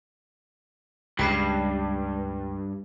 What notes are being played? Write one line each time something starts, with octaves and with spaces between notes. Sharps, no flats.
C#2 G2 C#3 G5 B5 C7